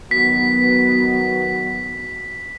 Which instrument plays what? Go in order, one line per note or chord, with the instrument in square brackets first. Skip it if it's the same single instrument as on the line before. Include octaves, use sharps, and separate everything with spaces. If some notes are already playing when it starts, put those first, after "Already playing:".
[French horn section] D#3 F#3 F#4 [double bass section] B3 [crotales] B6